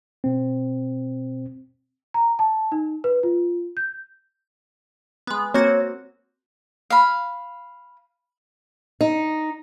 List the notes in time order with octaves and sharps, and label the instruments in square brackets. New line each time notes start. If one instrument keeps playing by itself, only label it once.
[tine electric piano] B2 C4
[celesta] A#5
A5
D#4
B4
F4
G6
[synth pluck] G#3 B3
[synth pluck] A#3 C4 F#4 [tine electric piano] C#5
[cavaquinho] F5 B5
[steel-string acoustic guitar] D#4